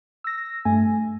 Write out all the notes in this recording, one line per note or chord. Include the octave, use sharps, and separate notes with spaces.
E6 A#6
G2 A3 G#5